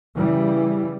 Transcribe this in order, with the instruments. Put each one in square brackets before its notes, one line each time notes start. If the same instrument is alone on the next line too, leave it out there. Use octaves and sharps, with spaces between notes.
[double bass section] C#3 E3 G3